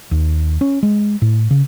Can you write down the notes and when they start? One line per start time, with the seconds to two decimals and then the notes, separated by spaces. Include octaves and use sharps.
0.11 D#2
0.61 C#4
0.83 G#3
1.22 A2
1.51 C#3